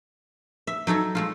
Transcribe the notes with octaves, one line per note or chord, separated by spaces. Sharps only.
E5
F#3 D#4 A4 C#5
G#3 A3 F4